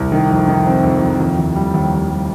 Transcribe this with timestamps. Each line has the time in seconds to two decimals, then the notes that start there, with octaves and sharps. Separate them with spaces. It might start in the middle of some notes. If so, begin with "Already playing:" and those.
Already playing: C2
0.12 D#3
0.30 F2
0.48 D#3
0.66 C4
0.83 F2
1.01 F2
1.19 D#2
1.38 D#2
1.56 G3
1.74 D#2
1.92 D#2
2.10 G3